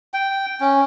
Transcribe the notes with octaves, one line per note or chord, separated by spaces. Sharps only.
G5
C#4